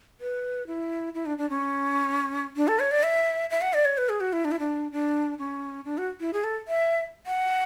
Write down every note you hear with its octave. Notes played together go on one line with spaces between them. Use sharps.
B4
E4
E4
D4
D4
C#4
D4
A4
C#5
D5
E5
E5
F#5
D5
C#5
B4
G#4
F#4
E4
D4
E4
D4
D4
C#4
D4
F#4
E4
G#4
A4
E5
F#5